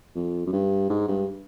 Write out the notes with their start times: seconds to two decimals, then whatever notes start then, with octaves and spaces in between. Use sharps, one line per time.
0.15 F2
0.46 F#2
0.53 G2
0.90 G#2
1.08 G2